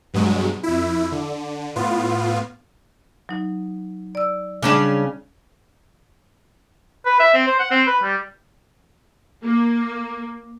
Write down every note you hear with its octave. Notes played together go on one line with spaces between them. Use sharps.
G2 B2 F#3 G#3
F2 E4
D3
A2 B3 F4
F#3 D#4
D5 E6
C#3 G3 C#4 D4 D6
B4
E5
C4
C5
F#5
C4
B4
G3
A#3